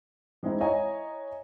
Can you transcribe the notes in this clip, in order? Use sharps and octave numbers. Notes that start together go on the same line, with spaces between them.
E3 G#3 C4 D#4 E4
E4 C#5 D#5 F#5 G#5 A#5